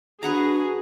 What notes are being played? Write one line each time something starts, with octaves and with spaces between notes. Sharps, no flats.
D4 F#4 G#4 B4 F#5 A#5